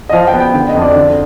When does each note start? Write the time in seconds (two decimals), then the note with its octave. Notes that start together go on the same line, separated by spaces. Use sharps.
0.09 D#5
0.13 F3 F5
0.27 G5
0.33 B3
0.40 G5
0.54 D3 G5
0.69 D#5
0.75 F2
0.82 D5
0.96 D3